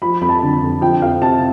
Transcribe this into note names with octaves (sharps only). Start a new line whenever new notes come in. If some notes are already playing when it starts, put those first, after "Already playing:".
F3 B5
F2 B5
A5
D3
F2
F3 G5
F2 F5
C3 A5